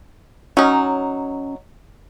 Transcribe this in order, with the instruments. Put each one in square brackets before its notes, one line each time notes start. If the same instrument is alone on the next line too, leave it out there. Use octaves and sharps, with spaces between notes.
[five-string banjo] F#3 D#4 [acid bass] C#4